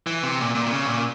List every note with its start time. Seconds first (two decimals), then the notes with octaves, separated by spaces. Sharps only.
0.07 E3
0.23 C3
0.39 A#2
0.55 A#2
0.66 C3
0.71 C#3
0.86 A#2